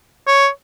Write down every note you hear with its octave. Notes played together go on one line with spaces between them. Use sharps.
C#5